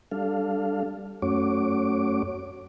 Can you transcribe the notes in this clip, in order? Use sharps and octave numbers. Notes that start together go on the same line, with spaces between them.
G3 D4 A4 F5
F#2 A3 C#4 F#4 C#5 D6